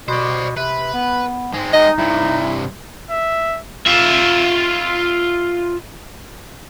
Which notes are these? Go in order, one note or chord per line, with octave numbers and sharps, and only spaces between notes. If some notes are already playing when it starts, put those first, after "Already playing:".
B2 C5 D5
C3 B4
B3
G#2 G#3 C4
D#4 D#5
G2 C3 E4
E5
F4 E5